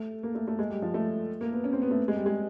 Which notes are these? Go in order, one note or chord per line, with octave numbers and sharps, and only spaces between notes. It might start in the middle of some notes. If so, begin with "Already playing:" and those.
Already playing: A3
A#3
A3
A3
G#3
G3
F3
A3
A#3
B3
C#4
C4
B3
A3
G#3
G3
G#3